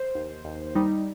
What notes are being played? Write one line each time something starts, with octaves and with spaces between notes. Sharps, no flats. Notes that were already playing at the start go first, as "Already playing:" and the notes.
Already playing: C5
D#2
D#2
G3 D#4